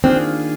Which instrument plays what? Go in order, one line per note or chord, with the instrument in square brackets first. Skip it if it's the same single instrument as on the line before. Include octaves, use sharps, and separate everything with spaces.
[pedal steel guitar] D#3 A#3 D4 F4 G#4 [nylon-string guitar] C4